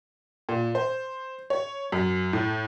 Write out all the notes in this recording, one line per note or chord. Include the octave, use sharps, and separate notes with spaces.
A#2
C5
C#5
F#2
A2